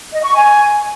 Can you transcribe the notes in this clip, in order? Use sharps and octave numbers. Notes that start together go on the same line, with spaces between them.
D#5
C#6
G#5